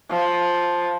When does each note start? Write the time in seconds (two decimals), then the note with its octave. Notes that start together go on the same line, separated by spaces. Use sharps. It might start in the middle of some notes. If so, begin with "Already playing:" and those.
0.10 F3